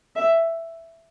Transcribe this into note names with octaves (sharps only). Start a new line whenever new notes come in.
E5